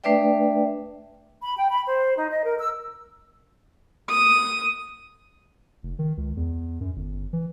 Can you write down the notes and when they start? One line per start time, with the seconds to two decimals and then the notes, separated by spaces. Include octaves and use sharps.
0.04 A3 D4 B4 D5 E5 G5
1.42 B5
1.57 G5
1.70 B5
1.86 C5
2.16 D#4
2.30 D#5
2.44 A#4
2.59 E6
4.09 D#6
5.83 F1
5.99 D#3
6.17 C#2
6.37 E2
6.81 F#2
6.96 G1
7.33 E3